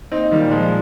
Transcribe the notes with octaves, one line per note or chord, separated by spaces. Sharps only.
A#3 C4 D#4
D#3 G3
A#2
F3 G#3
G3